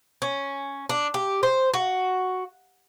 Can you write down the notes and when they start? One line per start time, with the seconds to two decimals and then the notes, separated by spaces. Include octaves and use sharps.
0.22 C#4
0.89 D4
1.14 G4
1.43 C5
1.74 F#4